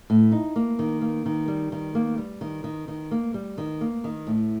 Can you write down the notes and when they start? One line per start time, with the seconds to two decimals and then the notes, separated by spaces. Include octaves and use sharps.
0.10 A2
0.32 D#4
0.56 A#3
0.79 D#3
1.01 A#3
1.26 D#3
1.48 G3
1.72 D#3
1.95 A#3
2.18 G3
2.41 D#3
2.64 D#3
2.88 D#3
3.11 A#3
3.34 G3
3.58 D#3
3.81 A#3
4.04 D#3
4.27 A2